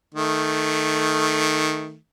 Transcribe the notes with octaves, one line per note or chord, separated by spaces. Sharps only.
D#3 A3